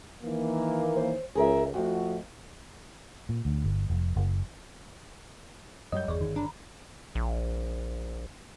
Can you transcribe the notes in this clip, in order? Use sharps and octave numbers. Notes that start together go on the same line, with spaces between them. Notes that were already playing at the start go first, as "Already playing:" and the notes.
D#3 E3 A#3
C5
C#2 G#4 A#4 E5
F2 F3 A3 F#4
A#2
D2
G1
F1
F#1
F#2 F#3 G3 C#5 D#5 G6
G1 E2 G#4 C#5 D5
D#3
D4 A#5 B5
A#1